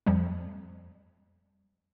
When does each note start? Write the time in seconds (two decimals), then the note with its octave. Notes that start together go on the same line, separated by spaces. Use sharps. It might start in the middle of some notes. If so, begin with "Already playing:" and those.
0.06 F2 F3 G3